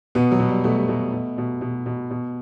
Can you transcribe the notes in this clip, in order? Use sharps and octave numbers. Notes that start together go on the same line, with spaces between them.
B2 B3
F#3
B2
G3
B2 A3
G3
B2 A3
B2
B2
B2
B2
B2